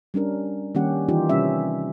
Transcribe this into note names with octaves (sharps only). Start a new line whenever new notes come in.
G3 C#4 D4 A#4
D#3 G3 A#3 C#4 G4 F#5
D#3 E3 D#4 F4 G4
C3 G3 C#4 E5